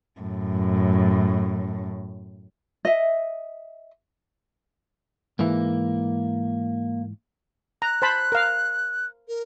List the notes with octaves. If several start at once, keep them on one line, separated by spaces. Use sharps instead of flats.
F#2 A2
D#5 E5
G#2 E3 A#3
A#5 F#6
C5 A5 B5
A#4 F5
A#4